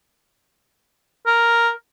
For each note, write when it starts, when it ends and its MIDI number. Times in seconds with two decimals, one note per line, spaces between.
1.26 1.70 70